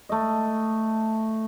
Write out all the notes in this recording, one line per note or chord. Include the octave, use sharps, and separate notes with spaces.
A3 D#5